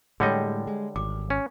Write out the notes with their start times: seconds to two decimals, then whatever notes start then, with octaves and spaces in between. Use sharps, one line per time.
0.20 A2 D3 G3 G#3 G#4 C#5 D#5 G5
0.67 G#3
0.96 G#1 D6
1.30 C#4